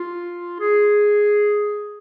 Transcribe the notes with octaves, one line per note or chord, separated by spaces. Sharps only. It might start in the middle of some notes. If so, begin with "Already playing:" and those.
Already playing: F4
G#4